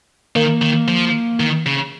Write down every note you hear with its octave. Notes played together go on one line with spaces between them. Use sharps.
D#3 A#3
D#3
F3
D#3
C#3